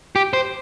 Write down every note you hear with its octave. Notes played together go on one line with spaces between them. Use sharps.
G4
C5